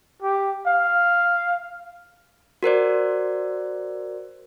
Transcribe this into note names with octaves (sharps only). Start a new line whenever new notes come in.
G4
F5
F#4 A#4 C5 D5